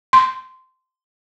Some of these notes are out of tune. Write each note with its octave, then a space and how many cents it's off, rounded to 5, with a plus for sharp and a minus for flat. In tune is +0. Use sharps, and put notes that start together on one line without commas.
C6 -15